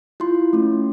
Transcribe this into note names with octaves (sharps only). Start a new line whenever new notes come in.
E4 F4 C6
A3 C#4